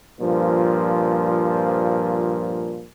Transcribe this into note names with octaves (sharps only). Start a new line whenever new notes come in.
G2 A#2 F3